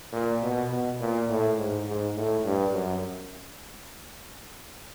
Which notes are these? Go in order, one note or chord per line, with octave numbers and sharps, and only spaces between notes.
A#2
B2
B2
A#2
A2
G#2
G#2
A2
G2
F#2